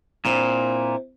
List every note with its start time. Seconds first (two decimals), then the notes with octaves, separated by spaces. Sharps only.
0.25 A#2 C4 D4 E4